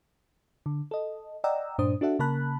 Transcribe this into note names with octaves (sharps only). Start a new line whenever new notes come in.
D3
A4 D#5
D5 D#5 F#5 G5 A#5 E6
G2 A#2 D4 C5 D#6
D4 F#4 A4 E5 F#5
C#3 A#3 A#4 A5 B5 F#6